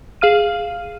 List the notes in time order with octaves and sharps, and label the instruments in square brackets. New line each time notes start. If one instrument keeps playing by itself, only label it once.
[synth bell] G#4 F5 F6 D#7